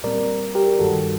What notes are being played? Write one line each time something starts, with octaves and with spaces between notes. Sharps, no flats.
A#2 G3 C4 A#4 D5
G4 A#4
G2 D#3 G3 F#4 A4